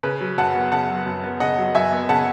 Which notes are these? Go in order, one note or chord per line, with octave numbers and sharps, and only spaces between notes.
C#3 B4
F#3
F#2 F#5 A5
B3
C#3 F#5 A5
F#3
F#2
B3
C#3 D#5 F#5
F#3
F#2 E5 G#5
B3
C#3 F#5 A5